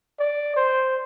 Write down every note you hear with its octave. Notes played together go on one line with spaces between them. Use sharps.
D5
C5